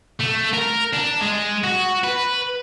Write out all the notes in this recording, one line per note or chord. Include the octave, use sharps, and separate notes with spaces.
A3
A#4
D4
G#3
F#4
B4